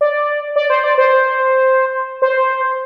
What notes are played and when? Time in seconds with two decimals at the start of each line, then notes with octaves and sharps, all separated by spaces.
0.01 D5
0.56 D5
0.70 C5
0.84 D5
0.98 C5
2.22 C5